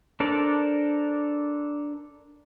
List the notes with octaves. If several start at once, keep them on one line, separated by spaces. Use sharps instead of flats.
D4 A4 A#4 C5 D5